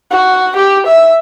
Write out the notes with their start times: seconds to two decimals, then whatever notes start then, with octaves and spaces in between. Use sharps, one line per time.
0.10 F#4
0.56 G4
0.87 E5